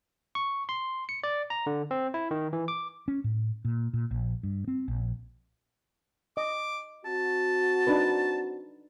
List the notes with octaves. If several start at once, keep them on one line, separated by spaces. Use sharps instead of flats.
C#6
C6
C#7
D5
A#5
D3
C4
E4
D#3
E3
D6
C#4
A2
A#2
A#2
A#1
G2
C4
A#1
D#5 D6
C4 F#4 A5
D4 D#4 B4